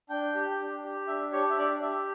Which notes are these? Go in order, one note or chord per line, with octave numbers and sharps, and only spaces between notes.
D4 G5
G4
D4
G4
D4 E5
G4 C#5
E5
D4 D5
G4 E5